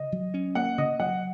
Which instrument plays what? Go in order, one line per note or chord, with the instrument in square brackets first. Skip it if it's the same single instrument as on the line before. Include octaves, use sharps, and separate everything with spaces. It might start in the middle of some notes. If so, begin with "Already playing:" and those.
Already playing: [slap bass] C#3 [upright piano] D#5
[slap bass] F#3
C#4
[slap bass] A#3 [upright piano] F#5
[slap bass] C#3 [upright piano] D#5
[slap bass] F#3 [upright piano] F#5